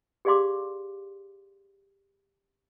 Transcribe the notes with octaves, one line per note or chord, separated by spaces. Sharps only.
G4 G#4 D5 F5 C6 D6